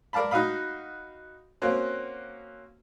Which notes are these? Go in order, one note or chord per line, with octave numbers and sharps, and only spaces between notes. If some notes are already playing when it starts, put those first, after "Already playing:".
A#4 D5 F5 A5 B5
D#4 F#4 D#5 F5 B5
A#3 C4 C#4 F#4